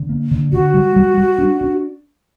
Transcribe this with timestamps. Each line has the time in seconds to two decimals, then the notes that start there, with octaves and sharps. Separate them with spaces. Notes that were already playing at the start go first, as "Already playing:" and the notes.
Already playing: D3
0.09 A#3
0.31 D3
0.52 D3 F#4
0.74 G3
0.96 G3
1.17 G3
1.38 D4
1.61 D4